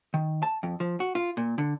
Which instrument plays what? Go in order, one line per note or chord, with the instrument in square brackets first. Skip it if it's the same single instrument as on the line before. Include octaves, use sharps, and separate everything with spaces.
[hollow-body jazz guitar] D#3
A5
F2
F3
F#4
F4
A#2
D3